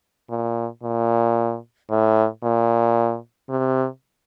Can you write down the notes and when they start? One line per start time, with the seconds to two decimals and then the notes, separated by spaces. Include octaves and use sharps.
0.30 A#2
0.83 A#2
1.90 A2
2.43 A#2
3.49 C3